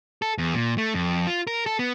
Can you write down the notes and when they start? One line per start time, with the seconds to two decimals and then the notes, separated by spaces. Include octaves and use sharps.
0.22 A4
0.38 E2
0.54 A#2
0.78 A3
0.94 F2
1.27 F4
1.47 A#4
1.66 A4
1.79 B3